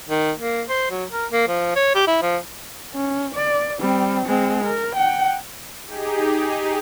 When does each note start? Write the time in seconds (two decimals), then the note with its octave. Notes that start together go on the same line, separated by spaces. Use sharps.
0.09 D#3
0.39 A#3
0.69 C5
0.91 F#3
1.12 A#4
1.31 A#3
1.48 F3
1.76 C#5
1.95 G4
2.07 E4
2.22 F3
2.94 C#4
3.35 D5
3.80 G3 C4
4.26 G#3 C4
4.65 A#4
4.96 F#5 G5
5.87 D#4 G4 G#4